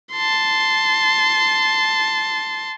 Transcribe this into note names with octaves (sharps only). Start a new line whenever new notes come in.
A5 C6